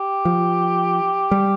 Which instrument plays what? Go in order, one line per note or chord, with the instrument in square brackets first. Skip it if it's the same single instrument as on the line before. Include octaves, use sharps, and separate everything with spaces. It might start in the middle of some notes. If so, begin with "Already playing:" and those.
Already playing: [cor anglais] G4
[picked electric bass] F3
G3